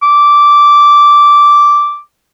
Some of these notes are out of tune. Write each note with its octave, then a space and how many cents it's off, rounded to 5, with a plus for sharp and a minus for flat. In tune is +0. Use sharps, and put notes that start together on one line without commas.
D6 -10